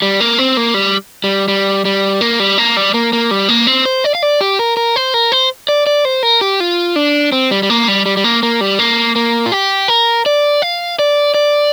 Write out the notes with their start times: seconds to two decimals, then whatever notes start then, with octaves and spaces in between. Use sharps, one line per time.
0.02 G3
0.20 A#3
0.38 C4
0.57 A#3
0.74 G3
1.24 G3
1.48 G3
1.85 G3
2.21 A#3
2.40 G3
2.58 A#3
2.77 G3
2.94 A#3
3.13 A#3
3.31 G3
3.49 A#3
3.67 C4
3.86 C5
4.04 D5
4.15 F5
4.23 D5
4.41 G4
4.59 A#4
4.77 A#4
4.96 C5
5.14 A#4
5.32 C5
5.68 D5
5.87 D5
6.05 C5
6.23 A#4
6.41 G4
6.60 F4
6.96 D4
7.32 C4
7.51 G3
7.63 G3
7.70 A#3
7.88 G3
8.06 G3
8.17 G3
8.24 A#3
8.43 A#3
8.61 G3
8.79 A#3
9.16 A#3
9.46 F4
9.52 G4
9.88 A#4
10.26 D5
10.62 F5
10.99 D5
11.34 D5